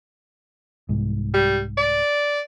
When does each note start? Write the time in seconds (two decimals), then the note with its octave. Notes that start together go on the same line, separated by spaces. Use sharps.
0.89 C2 G#2
1.34 G3
1.77 D5